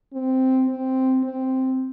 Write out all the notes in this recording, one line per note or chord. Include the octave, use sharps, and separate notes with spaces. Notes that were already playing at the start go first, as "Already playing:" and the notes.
C4
C4
C4